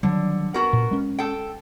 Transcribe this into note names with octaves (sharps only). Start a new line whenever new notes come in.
D3 D#3 F#3 G3
B3 F#4 A#4
A#2
G#3 C#4
A4 G5